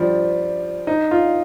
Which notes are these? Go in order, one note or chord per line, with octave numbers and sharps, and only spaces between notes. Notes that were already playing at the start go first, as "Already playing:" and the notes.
Already playing: F3 G3
D#4
F4